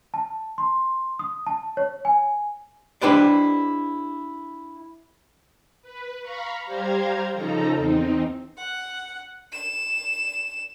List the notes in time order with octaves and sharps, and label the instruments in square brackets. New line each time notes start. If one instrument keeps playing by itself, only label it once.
[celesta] A5
C6
D#6
A5
C#5
G#5
[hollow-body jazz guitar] D4 E4 G4 B4 C5 D5
[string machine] B4
F5 A#5 B5 C#6
G3 G4 C5 F5 A#5 G#6
C#3 F3 D#4 A4 A#5
E2 C4 D#4
[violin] F#5
E7